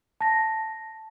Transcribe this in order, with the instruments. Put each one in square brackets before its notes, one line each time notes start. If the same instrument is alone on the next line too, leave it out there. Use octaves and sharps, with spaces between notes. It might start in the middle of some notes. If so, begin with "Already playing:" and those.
[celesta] A5 A#6